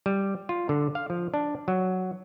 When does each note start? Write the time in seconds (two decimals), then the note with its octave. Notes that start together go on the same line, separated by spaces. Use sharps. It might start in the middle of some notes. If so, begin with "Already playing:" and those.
0.06 G3
0.49 F4
0.69 D3
0.95 F5
1.10 F3
1.34 D4
1.68 F#3